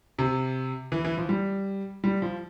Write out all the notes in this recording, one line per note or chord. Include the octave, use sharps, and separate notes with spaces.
C3
E3
E3
F3
G3
G3
F3